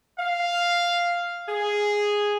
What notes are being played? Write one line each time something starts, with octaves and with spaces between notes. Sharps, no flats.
F5
G#4